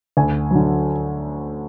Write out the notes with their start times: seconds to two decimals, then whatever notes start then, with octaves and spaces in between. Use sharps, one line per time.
0.17 D2 G#5
0.51 D3 F#3